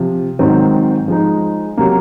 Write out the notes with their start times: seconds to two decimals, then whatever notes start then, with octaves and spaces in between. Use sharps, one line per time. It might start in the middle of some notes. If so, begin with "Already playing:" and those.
Already playing: C3 F3
0.39 G#2 D#3 F#3 C4
1.08 F3 G#3 D#4
1.77 C3 F#3 A#3